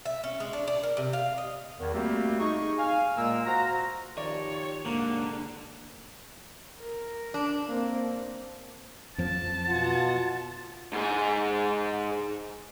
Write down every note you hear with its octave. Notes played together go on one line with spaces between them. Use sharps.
E5
C#4
G#3
D4
D4
A#4
C3
F5
D#5
E2 D#3
G3 A3 A#3 C4 F#4 G4
D#4 G#4 C#6
F5 G#5
A#2 G#3 A#3 A#4 E6
F#4 C5 F5 A#5
D#3 F3 G4 C#5 D5
C2 G#2 D3 A#3
A#4
D4
A#3 C4
F2 F3 F#3 A5
B2 F4 F#5
G#2 G#4